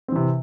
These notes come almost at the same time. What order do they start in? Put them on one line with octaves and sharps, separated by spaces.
C4 E3 C3